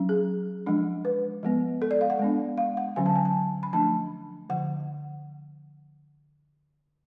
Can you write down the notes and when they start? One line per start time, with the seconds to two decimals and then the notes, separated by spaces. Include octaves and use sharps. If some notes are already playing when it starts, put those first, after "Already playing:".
Already playing: F#3 C#4
0.09 G#4
0.66 F3 G#3 D4
1.05 B4
1.43 F3 G#3 B3
1.82 A4
1.91 D5
2.01 F5
2.10 F#5
2.19 G#3 B3 D4
2.58 F5
2.77 F#5
2.96 D3 F#3 C#4 G#5
3.06 A5
3.16 G#5
3.25 A5
3.63 B5
3.73 F3 A3 D4 A5
4.49 D3 F3 F#5